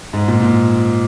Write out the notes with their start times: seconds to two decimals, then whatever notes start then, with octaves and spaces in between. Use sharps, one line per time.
0.13 G#2
0.28 A#2
0.42 A#2